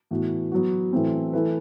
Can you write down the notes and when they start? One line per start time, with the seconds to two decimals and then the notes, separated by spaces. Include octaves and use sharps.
0.11 A2 E3 B3 F#4
0.52 F#3 B3 F#4
0.92 A2 E3 A3 C4 F#4
1.33 E3 A3 E4 B4